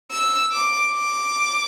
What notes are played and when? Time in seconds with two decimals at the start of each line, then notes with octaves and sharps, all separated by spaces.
0.12 E6
0.52 D6
0.93 D6